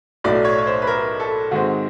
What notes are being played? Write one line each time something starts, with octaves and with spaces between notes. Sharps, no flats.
B1 A2 F#3 A3 D5
C#5
C#5
C5
B4
A#4
A4
G#2 D#3 G#3 C4 F#4